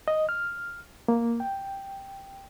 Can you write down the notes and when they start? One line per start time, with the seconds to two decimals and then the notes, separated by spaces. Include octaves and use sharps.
0.08 D#5
0.29 F6
1.08 A#3
1.40 G5